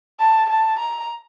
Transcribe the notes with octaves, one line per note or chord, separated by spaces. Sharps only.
A5
A5
A#5